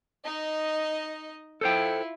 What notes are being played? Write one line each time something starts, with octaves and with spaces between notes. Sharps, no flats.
D#4 D#5
E4 F4 A4 C5 G5